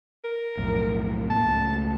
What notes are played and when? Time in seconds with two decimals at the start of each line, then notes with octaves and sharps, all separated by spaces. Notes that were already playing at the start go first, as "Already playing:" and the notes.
0.24 A#4
0.57 B1 F2 A2
1.30 A2 A#3 B3 A5
1.46 C#2 A3